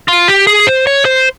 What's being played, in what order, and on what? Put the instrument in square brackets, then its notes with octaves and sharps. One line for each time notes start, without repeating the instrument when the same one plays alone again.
[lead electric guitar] F4
G4
G#4
C5
C#5
C5